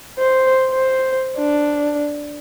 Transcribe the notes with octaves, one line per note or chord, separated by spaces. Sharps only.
C5
C5
D4